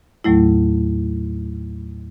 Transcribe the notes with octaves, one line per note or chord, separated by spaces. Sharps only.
D#2 A2 F#3 A3 E4